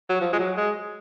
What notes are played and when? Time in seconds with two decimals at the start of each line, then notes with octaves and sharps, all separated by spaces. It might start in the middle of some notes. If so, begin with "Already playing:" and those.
0.09 F#3
0.21 F3
0.33 G#3
0.39 F#3
0.57 G#3